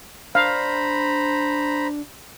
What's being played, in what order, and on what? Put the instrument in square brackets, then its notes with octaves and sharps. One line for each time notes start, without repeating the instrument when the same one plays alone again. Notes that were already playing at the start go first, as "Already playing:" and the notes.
[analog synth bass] D4 [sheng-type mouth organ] C5 A#5 B5 [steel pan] F5